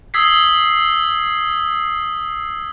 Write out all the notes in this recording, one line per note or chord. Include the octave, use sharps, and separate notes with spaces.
D#6 E6 G#6 B6 C7